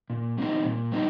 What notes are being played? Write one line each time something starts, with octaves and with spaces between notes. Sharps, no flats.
A#2
G3 C4 D#4
A#2
G3 C4 D#4